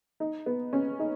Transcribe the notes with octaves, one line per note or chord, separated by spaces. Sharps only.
D#4
B3
C#4
D#4